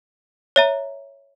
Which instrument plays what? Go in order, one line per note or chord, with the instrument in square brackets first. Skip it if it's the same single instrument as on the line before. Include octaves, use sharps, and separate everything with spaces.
[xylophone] C#5 E5 A#5